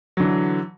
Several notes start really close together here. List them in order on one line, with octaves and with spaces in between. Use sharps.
F#3 D3 E3